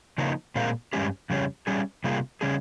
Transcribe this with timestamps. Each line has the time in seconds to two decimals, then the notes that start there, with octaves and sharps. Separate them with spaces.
0.18 C#3 F3 A#3 D#4
0.56 A#2 G#3 C4 F4 A#4
0.93 G2 D#3 G#3 C#4 G4
1.30 F2 C#3 G3 C#4
1.67 G3 C#4 G#4
2.04 C3 G3 A#3 F4 G#4
2.41 C#3 G3 C#4 G#4